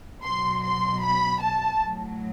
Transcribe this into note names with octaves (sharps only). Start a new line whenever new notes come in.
B2 F#3 C6
C6
B5
A5
A2 F#3